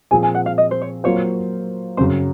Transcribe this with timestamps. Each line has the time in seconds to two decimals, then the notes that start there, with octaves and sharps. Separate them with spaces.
0.11 A#2 F3 C4 F4 G#4 G#5
0.23 G#5
0.35 F#5
0.46 F5
0.58 D#5
0.71 C5
0.81 C#5
1.04 F#3 A#3 F4 C5 C#5
1.97 F#2 C#3 F#3 C#4 C5